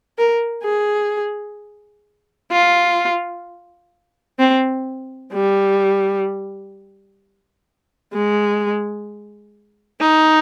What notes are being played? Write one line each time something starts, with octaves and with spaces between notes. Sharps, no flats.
A#4
G#4
F4
C4
G3
G#3
D#4